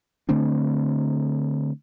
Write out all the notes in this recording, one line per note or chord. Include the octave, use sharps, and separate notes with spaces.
D3 A3 C4 D4